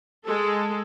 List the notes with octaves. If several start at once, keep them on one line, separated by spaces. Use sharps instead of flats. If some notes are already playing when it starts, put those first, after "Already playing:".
G#3 A4